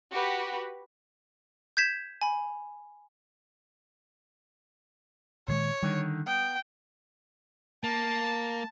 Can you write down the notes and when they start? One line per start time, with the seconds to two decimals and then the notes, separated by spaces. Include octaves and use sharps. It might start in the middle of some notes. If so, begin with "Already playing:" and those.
0.12 F#4 G4 B4
1.77 G6 G#6 B6 E7
2.21 G#5 B5
5.48 A#2 D#3 G#3 C#5
5.83 D3 D#3 G3
6.27 B3 G5
7.84 A#3 A5